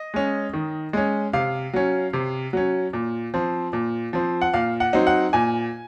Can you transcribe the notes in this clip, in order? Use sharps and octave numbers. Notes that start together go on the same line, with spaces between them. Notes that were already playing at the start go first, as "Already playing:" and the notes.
Already playing: D#5
G#3 C#4
D#3
G#3 C#4
C3 F5
F#3 C#4
C3
F#3 C#4
A#2
F3 C4
A#2
F3 C4
F#5
A#2 F5
F#5
F#3 C4 D#4
F#5
A#2 G#5